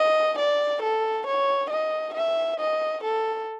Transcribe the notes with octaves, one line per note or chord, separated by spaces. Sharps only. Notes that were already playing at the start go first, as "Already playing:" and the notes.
Already playing: D#5
D5
A4
C#5
D#5
E5
D#5
A4